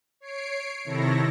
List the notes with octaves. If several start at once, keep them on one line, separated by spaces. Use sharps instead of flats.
C#5 C7 D7
C3 D#3 E4 A4 C#5 A#6